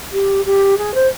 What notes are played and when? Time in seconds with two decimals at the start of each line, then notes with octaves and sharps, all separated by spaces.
0.13 G4
0.45 G4
0.78 G#4
0.94 C5